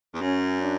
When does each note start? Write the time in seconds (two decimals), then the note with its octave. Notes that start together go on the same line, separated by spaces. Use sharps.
0.14 E2
0.21 F#2 C#4
0.61 D4